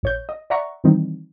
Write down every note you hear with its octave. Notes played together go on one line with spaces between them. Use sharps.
A#1 C#5 G6
D#5
D5 E5 F#5 A#5 C#6
D#3 E3 G3 C4 D#4